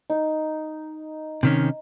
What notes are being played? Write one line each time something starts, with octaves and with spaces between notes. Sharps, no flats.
D#4
C3 D#3 C#4